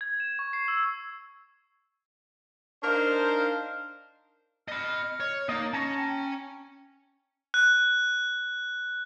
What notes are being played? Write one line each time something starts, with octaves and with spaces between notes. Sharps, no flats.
G#6
E7
C#6
C7
E6
D4 D#4 A#4 C5 F5
D#5 B5 F6
C#5
A#3 D#4 D#5 A6
C#4 A5 A#5 C#6
G5
F#6